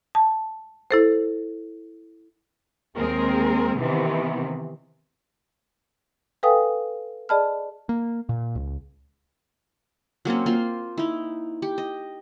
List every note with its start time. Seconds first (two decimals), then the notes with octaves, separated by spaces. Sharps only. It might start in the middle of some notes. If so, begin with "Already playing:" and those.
0.15 A5
0.91 E4 A4 C5
2.97 D#2 G#3 C4 G#4 A#4
3.78 C3 D#3 E3 B3 C4
6.43 A4 B4 F5 G5 G#5 D#6
7.29 G#4 D5 D#5 A5 B5 F6
7.89 A#3
8.29 A#2
8.55 C#2
10.25 F#3 A#3 C4 C#4
10.46 A#3 F4 C6
10.98 D#4 E4
11.62 G4
11.78 D#5